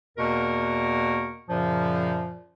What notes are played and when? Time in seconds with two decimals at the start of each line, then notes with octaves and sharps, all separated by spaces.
0.18 E2 B2 A#3 A#4 C#6
1.49 F#2 A#2 C#3 F3